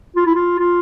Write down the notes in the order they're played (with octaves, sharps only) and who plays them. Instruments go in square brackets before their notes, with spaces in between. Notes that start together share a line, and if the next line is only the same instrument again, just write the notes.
[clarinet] F4
E4
F4
F4